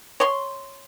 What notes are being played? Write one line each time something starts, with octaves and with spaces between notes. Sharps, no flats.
C#5 C6